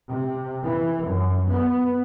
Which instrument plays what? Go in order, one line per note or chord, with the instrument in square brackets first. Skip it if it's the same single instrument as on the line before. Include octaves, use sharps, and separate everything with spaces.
[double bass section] C3
E3
F#2
B3